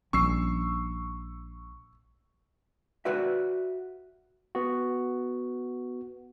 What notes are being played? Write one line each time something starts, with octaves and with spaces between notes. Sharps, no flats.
A#1 G3 C#4 C#6 E6 C7
F#4 B4 D5 E5
B3 F#4